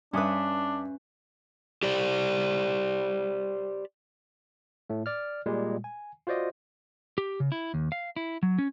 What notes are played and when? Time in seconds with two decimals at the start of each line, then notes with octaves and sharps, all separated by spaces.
0.13 G2 C#4 D4 B4 E5 D#6
1.83 G4 C5 D5
4.90 A2 A3
5.06 D5 F6
5.46 A#2 G3 G#3
5.84 G#5
6.27 F4 F#4 C5 D5 D#5
7.18 G4
7.40 C#3
7.52 E4
7.74 D#2
7.92 F5
8.16 E4
8.43 F#3
8.58 C#4